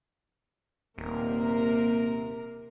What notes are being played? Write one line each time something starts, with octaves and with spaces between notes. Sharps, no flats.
D#1 C3 A#3 A#4